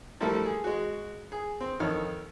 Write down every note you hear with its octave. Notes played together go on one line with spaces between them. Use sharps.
F3 G3 A3 A#3 E4 A4
G#4
G#3 F#4
G#4
C4
F2 D#3 A4 C#5 F6